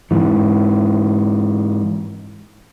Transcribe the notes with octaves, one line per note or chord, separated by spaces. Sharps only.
G#2 E3